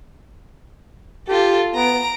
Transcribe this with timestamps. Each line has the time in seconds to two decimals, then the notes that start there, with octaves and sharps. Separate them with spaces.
1.28 F4 G4 A4
1.75 B3 A#5 D7